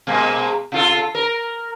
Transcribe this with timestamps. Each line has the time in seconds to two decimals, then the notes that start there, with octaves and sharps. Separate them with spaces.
0.07 B2 G#3 A#3
0.72 C3 F4 A4
1.15 A#4